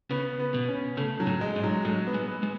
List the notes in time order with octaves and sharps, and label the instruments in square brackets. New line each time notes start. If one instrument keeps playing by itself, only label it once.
[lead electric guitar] C#3 [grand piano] B3
[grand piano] B3
[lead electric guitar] B2
[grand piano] C#4
[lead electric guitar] C#3 [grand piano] A3
[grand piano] F#3
[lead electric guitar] A2
[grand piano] G#3
[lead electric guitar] G#2
[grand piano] F#3
[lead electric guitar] A2 [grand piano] F#3
[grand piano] B3
[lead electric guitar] G#3
[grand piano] B3
[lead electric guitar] G#3